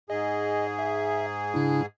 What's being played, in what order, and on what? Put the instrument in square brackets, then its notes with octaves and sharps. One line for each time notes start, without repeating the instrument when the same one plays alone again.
[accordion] G#2 G#4 [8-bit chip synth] D#5
[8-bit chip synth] E5
C#3 D4 E4